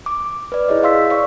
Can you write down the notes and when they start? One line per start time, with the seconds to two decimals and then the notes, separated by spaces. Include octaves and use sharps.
0.06 D6
0.52 B4 D5
0.68 E4 G#4 C#5 D#5
0.83 F5 C6 E6 B6
1.10 D5 F5 C#6